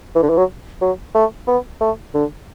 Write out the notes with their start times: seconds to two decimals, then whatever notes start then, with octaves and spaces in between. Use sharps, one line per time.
0.15 E3
0.23 D3
0.30 E3
0.37 F#3
0.81 F#3
1.15 A3
1.47 B3
1.81 A3
2.15 D3